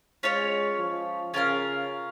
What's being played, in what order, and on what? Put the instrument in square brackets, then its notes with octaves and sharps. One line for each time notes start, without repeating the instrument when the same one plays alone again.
[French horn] G#3 [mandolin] C#4 F4 C#5
[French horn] F3
[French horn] C#3 [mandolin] C#4 F4 A#4 F5